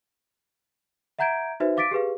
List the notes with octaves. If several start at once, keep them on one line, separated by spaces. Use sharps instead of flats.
E5 F#5 A#5 G6 G#6 D7
D#4 F#4 B4 C5 E5
F5 D6 A6 B6 D7
G4 G#4 B4 F5